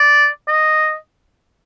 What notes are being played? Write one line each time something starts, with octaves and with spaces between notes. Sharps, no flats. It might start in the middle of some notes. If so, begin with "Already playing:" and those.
Already playing: D5
D#5